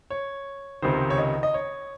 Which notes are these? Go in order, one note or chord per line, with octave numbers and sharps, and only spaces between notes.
C#5
C#2 C3 D#3 C5
C#5
D#5
D#5
C#5